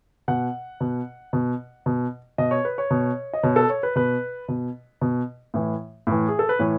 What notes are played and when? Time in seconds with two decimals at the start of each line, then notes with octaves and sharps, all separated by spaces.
0.28 B2 F#5
0.81 B2
1.33 B2
1.86 B2
2.38 B2 D#5
2.51 C#5
2.65 B4
2.78 C#5
2.91 B2
3.33 D#5
3.43 B2 C#5
3.56 A4
3.70 C#5
3.83 B4
3.96 B2 B4
4.48 B2
5.01 B2
5.54 A2 E3
6.07 A2 E3
6.28 G#4
6.39 A4
6.49 B4
6.59 A2 E3 C#5